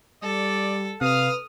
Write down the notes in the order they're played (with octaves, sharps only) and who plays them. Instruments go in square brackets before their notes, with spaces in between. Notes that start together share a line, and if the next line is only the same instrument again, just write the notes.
[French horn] G3 [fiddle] A4 [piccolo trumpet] D5
[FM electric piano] C3 [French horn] B4 [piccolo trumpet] F5 [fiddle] D#6 F6